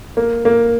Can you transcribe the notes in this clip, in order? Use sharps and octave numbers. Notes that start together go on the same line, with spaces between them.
A#3
A#3